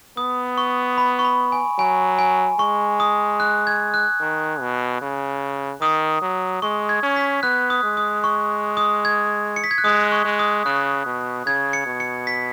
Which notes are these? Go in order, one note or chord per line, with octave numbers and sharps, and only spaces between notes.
B3 D#6
C#6
B5
C#6
B5
G#5
F#3 G#5
G#5
G#3 C#6
D#6
F#6
G#6
F#6
D#3
B2
C#3
D#3 D#6
F#3
G#3 C#6
G#6
C#4
B6
B3 F#6
D#6
G#3
D#6
C#6
D#6
G#6
C#7
B6
G#6
F#6
G#3 D#6
C#6
G#3
D#6
C#3 F#6
B2
C#3 G#6
C#7
B2
C#7
B6